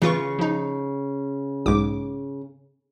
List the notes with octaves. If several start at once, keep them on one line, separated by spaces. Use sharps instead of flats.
C#3 E3 F4 C#6
F3 D#4
B1 G#2 D6